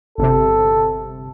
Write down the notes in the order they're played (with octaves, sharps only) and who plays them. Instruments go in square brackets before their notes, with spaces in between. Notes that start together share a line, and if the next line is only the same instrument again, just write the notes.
[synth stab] G1 C3 [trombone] A4